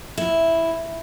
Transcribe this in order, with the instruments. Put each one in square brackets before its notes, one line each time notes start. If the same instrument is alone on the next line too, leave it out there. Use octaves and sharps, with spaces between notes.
[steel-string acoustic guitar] E4